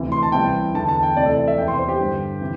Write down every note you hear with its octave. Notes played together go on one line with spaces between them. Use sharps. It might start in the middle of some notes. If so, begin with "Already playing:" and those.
Already playing: D2 C3 E3
C6
A5
C2 C3 E3 G5
E2 D3 A5
A5
G5
D2 C3 E3 D5
A4
D5
E5
E2 C3 E3 G5
C6
C5
G4
G2 D3
C3 E3